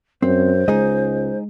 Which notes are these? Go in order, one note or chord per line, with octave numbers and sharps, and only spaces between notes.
F#2 C4 C5
C#2 G#3 D#4 G#4 D#5